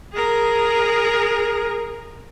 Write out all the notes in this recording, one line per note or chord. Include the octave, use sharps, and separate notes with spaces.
G#4 A#4